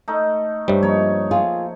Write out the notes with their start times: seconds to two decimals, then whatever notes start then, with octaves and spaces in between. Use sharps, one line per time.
0.08 A3 D#4
0.68 G2 G3 C5 C#5 E5
0.83 F3 A#3 D#4 C#5
1.31 F4 G#4